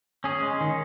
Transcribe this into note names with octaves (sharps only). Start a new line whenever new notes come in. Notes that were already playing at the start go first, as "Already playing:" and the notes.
C#4 G#4
G#3
D#3